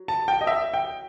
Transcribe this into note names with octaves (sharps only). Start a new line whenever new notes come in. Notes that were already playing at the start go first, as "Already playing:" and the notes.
Already playing: F#3
A5
G5
D#5
E5
G5